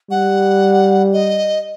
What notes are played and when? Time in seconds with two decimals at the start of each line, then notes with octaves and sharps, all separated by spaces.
0.10 G3 F#5
1.13 D#5